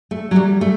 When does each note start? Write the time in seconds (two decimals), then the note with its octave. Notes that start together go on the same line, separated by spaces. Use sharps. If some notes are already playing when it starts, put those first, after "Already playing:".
0.11 A3
0.31 F#3
0.36 G3
0.61 A3